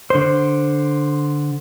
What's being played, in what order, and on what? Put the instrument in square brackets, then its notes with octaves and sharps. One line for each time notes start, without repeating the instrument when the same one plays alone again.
[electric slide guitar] D3 C5